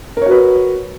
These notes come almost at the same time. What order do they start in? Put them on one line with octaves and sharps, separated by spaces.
A#4 C#5 F#4 B4